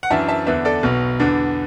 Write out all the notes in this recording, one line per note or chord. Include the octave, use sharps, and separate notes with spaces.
F#5
F#2 E3 D4 E5 A5
E5 A5
E2 D3 B3 D4 B4 E5
A4 D5
B1 B2 B3
E2 D3 B3 D4